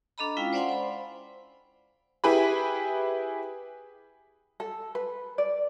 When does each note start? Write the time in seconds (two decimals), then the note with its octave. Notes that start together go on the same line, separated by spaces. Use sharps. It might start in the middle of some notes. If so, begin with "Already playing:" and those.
0.18 D4 A4 D#5 A#5 B5
0.37 G#3 C#4 E4 F4 F5 G5
0.53 C5 D5 F5 F#5 G#5 C6
0.69 C5 B5
2.24 E4 G4 G#4 B4 B5
4.60 A4
4.95 B4
5.38 D5